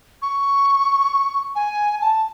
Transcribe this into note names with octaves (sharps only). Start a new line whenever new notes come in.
C#6
G#5
A5